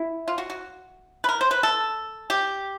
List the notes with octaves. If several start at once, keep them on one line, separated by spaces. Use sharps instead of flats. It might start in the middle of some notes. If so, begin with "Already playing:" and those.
Already playing: E4
F4
F#4
F#4
B4
A#4
C5
B4
A4
G4